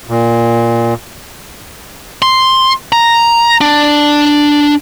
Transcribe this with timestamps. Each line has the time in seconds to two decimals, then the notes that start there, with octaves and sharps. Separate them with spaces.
0.09 A#2
2.22 C6
2.92 A#5
3.61 D4